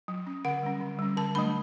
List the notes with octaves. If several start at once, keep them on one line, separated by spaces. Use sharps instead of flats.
F#3
C#4
D3 F#5
G3 C#4
D3
G3 C#4
D3 A5
F#3 A3 D4 B5